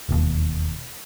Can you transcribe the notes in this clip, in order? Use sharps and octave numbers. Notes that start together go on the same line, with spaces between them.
E1 D#2